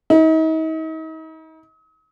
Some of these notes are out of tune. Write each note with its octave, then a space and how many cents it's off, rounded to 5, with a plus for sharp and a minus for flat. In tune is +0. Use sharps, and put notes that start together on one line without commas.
D#4 +40